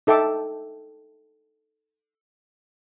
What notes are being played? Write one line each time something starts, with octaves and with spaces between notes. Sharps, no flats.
D#4 A4 E5 G5 D6